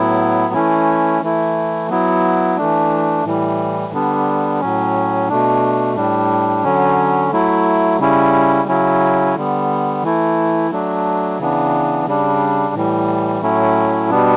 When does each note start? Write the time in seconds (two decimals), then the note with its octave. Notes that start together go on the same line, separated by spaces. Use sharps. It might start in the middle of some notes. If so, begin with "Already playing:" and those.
Already playing: A2 F#3 B3 E4
0.53 E3 A3 C#4 E4
1.22 E3 A3 E4
1.90 F#3 B3 E4
2.57 E3 A3 D4
3.25 A2 E3 G3
3.93 D3 G3 B3 D4
4.61 A2 F#3 C#4
5.29 B2 A3 D4
5.96 A2 G3 D4
6.64 D3 F#3 C#4
7.32 F#3 A3 E4
8.00 C#3 G3 C#4 E4
8.68 C#3 F#3 C#4 E4
9.35 D3 G3 B3
10.03 E3 A3 E4
10.71 F#3 A3 D4
11.39 C#3 E3 B3 D4
12.07 C#3 G3 D4
12.74 A2 E3 G3
13.42 A2 F#3 A3 C#4 E4
14.10 B2 G3 B3 D4